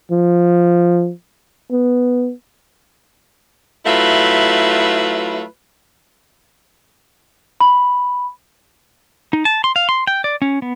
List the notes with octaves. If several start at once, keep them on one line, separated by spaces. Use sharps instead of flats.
F3
B3
F#3 A3 E4 F4 B4
B5
D#4
A5
C6
F5
C6
G5
D5
C#4
B3